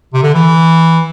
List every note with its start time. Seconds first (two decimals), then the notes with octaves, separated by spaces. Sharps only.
0.14 C3
0.23 D3
0.35 E3